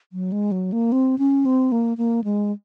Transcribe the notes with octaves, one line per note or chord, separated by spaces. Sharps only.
F#3
G#3
F#3
A#3
C4
C#4
C4
A#3
A#3
G#3